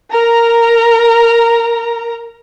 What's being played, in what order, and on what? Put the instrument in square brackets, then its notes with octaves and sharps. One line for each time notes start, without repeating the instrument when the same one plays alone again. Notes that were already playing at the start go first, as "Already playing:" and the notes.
[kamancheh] A#4 A#5